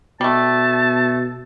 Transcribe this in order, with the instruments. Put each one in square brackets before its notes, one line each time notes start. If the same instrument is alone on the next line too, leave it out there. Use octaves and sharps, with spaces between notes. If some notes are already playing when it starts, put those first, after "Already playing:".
[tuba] B2 [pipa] G3 A3 [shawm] A5